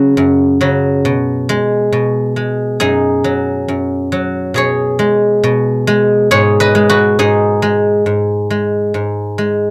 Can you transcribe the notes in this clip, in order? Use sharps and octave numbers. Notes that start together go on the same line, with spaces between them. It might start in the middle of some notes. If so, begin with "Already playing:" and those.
Already playing: C#3 F#3 C#4
F#2
C#3 F#3
B2
G#3
B2
G#3
F#2 D#4 G#4
F#3
F#2
F#3
B2 G#4 C#5
G#3
B2
G#3
G#2 G#4 C#5
B4 D#5
G#3
F#4 B4
G#2 D#4 G#4
G#3
G#2
G#3
G#2
G#3